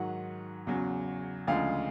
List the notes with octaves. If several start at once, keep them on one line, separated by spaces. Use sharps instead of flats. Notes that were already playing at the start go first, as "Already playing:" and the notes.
Already playing: G#2 D#3 F#3 F#5
E2 C#3 F#3
D2 C#3 F3 G#3 F5